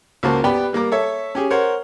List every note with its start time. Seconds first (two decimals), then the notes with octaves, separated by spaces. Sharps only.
0.23 C#2 A#3 F#4 C5 A5
0.44 B3 G4 B4 D5 G5
0.73 G3 A#3 A#5 D6
0.92 A4 C#5 E5
1.35 C#4 G4 G#4
1.50 A#4 C5 C#5 F#5